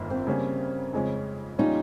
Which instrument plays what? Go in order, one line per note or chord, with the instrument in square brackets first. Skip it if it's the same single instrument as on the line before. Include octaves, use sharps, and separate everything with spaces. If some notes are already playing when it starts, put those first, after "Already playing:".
Already playing: [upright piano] G1 F2 D#3 A#3
[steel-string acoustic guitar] C4
[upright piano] C#3 G3 A#3 C#4
F2 C#3 G#3 C#4
[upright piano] A#2 G3 C#4 F4 [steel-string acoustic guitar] D#4